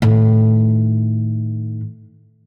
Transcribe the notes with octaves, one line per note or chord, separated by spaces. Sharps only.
A2 D#3